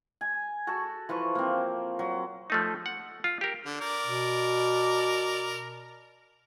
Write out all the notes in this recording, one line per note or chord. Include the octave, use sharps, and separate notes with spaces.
G#5
F#4 A4 A5
E3 F3 B4 C#6
A#3 C4
F#3
F3 A3 D#4
F#5
F4
G4 A#4
D3
A#4 D5
B2